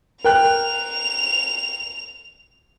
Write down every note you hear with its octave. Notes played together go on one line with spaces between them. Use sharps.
A#4 G5 F#6 F7